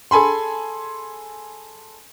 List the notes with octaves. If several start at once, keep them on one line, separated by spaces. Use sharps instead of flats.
G#4 A4 G#5 B5 C6